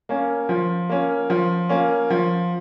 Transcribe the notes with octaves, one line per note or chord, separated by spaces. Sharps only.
A#3 C#4
F3
A#3 C#4
F3
A#3 C#4
F3